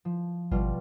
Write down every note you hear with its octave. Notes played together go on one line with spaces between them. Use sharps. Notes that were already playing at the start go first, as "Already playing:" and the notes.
F3
G#1 B2 G3 F4